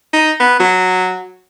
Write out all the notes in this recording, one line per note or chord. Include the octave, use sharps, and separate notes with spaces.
D#4
B3
F#3